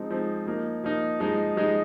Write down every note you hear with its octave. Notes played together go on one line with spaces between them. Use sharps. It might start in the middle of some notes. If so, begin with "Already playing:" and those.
Already playing: F3 G#3 C4 D#4
F3 G#3 C4 D#4
F3 A#3 D#4
F3 A#3 D#4
F3 G#3 D#4
F3 G#3 D#4